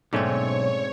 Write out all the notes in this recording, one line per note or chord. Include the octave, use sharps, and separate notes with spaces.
B1 G#2 D3 A3 C4 C#4 C#5